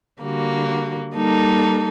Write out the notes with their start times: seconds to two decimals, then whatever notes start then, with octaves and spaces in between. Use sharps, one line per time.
0.21 D3 G3 A#3 F#4
1.15 G3 A#3 D#4 A4